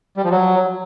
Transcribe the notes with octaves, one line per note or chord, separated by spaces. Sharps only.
G3
F3
F#3